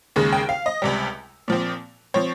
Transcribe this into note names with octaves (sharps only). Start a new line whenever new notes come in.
D#2 C#3 G#3
G5
F5
D#5
C#2 C3 G3
A#2 F3 C4
F3 C4 C#5